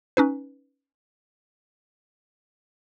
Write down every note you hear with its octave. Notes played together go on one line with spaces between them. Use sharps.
C#4 D#4 B4